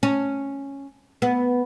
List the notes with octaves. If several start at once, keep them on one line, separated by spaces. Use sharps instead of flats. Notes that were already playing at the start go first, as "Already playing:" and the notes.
C#4
B3